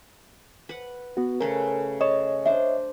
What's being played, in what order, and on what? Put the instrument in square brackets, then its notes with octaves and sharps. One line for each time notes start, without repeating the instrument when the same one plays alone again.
[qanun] B4 F#5
[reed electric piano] B3 F#4
[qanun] C#3 A3 B4 [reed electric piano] A#4
[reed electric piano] C#5 D#5 [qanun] A5
[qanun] D4 C5 [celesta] E5